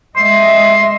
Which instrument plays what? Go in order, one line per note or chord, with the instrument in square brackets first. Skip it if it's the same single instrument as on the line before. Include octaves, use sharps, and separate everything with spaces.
[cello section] G#3 D#5 E5 [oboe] C6